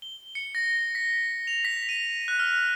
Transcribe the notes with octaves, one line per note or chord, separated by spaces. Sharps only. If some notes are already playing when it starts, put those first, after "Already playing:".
G7
C#7
A#6
B6
F7
B6
D#7
F#6
F6